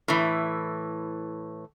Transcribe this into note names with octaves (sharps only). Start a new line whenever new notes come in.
A2 E3